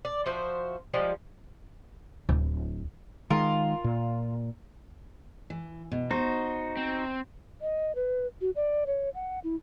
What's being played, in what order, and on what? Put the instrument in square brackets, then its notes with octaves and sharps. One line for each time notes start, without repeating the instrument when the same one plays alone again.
[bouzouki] D5
F3 F#4 C5 E5
F3 G3 G#3
[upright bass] D1
[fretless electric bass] D#3 G#3 [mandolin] F4 A#4
[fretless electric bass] A#2
[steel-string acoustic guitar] E3
B2
[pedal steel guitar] D#4 F#4 [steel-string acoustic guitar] C5
[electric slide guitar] C4
[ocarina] D#5
B4
F#4
D5
C#5
F#5
E4